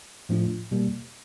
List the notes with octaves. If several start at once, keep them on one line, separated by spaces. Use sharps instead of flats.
A2 F3 A3 D4 F4
B2 G3 A#3